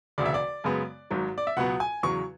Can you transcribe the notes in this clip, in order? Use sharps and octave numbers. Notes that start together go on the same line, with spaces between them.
E1 D2 C#3 D5
E5
D5
F#2 C#3 G#3 B3
G#1 G#2 F#3
D5
E5
C#2 B2 F#3 B3 F#5
G#5
E2 C#3 F#3 C#6